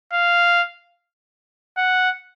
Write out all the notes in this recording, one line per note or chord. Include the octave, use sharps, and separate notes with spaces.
F5
F#5